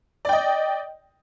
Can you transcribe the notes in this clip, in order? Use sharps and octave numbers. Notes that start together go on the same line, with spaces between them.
D5 D#5 G5